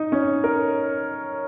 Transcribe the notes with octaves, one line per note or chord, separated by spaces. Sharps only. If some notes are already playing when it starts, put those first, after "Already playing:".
Already playing: D#4 D#5
C#4 C#5
A#4